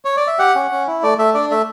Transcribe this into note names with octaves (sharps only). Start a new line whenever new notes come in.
C#5
D5
E5
G4 F#5
C#4
C#4
E4
A3 D5
A3 E5
D4 D5
A3 E5